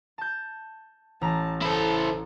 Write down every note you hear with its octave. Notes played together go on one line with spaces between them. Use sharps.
A5 G6
A1 A5 A#5 A#6
E4 A4 C5